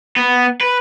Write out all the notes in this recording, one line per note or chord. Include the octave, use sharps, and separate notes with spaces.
B3
B4